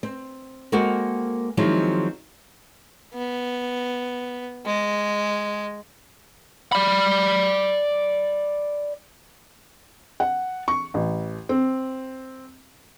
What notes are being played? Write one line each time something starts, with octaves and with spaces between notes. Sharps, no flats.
C4
G#3 A#3 C4 F#4 A4 A#4
D#3 F3 F#3 G#3 C4 E4
B3
G#3
D5 B5
F#5
C#6
A1
C4